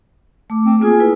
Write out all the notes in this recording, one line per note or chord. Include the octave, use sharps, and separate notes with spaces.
A3 D6
C4
A#3 F4 G#4 G#5
A#3 E4 B4